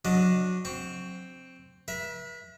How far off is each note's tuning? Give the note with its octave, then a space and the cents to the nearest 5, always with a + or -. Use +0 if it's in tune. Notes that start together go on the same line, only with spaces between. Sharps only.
F#3 -20 D4 +0 D#5 +5
C4 +0 C#6 +20
B4 -45 E5 +0